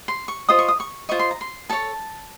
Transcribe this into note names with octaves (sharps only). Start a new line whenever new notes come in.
C6
C#6
F4 C5 D#5 D#6
C#6
D#6
C#6
F4 C5 D#5 C#6
C6
A#5
C6
A4 C#5 A5